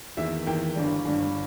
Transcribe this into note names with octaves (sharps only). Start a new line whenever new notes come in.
E2 D#3 A#3 E5
E2 D#3 A#3 G5
G1 G2 G3
G1 G2 G3